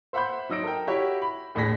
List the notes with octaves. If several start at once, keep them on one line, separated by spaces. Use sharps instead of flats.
C5 E5 F#5 B5 C6 G6
F#3 D#4 E6 A#6 D7
A4 A#4 G5
E4 F#4 G4 C#5
B5
D#2 A2 D4 G#4 A#6 B6